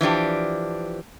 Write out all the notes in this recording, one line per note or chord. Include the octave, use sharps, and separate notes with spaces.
E3 F3 D4 G4